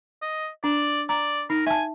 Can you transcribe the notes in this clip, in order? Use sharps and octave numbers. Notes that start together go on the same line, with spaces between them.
D#5
D4 D5
D5 A#5
D#4 A#4
E5 G#5 A5